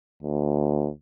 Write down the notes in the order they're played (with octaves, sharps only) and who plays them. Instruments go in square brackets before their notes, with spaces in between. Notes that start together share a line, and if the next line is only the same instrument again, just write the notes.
[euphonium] D2